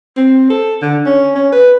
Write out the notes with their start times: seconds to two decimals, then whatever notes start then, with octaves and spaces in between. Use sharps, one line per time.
0.17 C4
0.50 A4
0.82 D3
1.06 C#4
1.35 C#4
1.52 B4